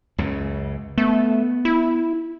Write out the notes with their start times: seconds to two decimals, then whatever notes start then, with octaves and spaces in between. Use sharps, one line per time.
0.18 C#2 F#2 C#3
0.98 A3 B3
1.65 E4